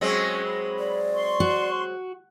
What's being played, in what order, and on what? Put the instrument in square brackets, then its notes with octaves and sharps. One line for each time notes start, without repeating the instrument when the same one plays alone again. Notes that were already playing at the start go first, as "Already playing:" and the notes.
[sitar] F#3 G#3 C4 [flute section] C#4
[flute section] B5
[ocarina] D5
[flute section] C6 C#6
[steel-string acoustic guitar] F#4